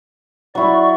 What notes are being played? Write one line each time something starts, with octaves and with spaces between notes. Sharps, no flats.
F#3 E4 D5 C#6